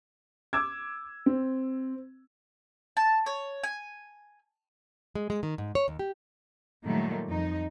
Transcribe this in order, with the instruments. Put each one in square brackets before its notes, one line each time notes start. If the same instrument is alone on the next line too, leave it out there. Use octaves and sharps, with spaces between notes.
[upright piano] D6 E6 G#6
C4
[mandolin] A5
C#5
G#5
[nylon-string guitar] G#3
G#3
D#3
G#2
C#5
D#2
G4
[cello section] A#2 D#3 F#3 G3 A3
F2 D#4